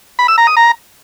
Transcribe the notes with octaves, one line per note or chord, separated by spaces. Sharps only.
B5
E6
A#5
D#6
A#5